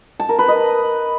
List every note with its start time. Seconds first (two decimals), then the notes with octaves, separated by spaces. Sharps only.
0.20 A5
0.29 A#4
0.39 B4
0.48 D#5